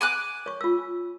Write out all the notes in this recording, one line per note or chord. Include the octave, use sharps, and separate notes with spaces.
G#5 D6 F#6
C#5 C#6
F4 E6